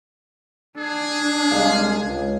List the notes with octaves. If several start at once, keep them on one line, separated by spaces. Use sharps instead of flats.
D4 G#4
C2 G#3 F5
C#2